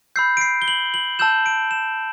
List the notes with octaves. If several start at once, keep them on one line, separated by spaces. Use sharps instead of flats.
B5 E6 G6 C7
D7
C7
G7
F#7
F#7
A5 E6 G6 E7
D7
E7